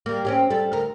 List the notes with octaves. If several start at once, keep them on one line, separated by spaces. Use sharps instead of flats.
G3 A#3
C4 C#4 G4
G3 A4
D2 A#4